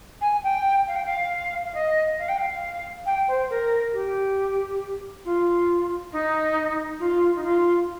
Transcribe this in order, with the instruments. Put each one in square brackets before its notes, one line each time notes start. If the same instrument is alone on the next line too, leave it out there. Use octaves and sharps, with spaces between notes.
[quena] G#5
G5
F5
G5
F5
F5
D#5
F5
G5
F5
G5
C5
A#4
G4
F4
D#4
F4
D#4
F4